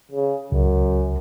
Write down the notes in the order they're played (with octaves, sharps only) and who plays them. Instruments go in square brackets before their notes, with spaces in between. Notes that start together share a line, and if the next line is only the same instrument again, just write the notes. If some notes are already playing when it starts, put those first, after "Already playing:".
[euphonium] C#3
[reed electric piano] C#2 [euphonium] F#2